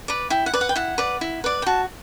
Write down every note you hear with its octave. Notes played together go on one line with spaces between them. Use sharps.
B4 D5
E4 G5
F#5
B4 D5
F#5
G5
E4 F#5
B4 D5
E4
B4 D5
G5
F#4 A5